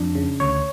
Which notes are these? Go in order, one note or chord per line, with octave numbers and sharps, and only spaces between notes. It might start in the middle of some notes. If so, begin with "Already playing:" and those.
Already playing: F2 D4
C#3
D2 C#5